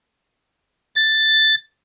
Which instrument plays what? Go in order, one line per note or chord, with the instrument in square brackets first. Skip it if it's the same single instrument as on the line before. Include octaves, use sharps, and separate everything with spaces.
[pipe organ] A6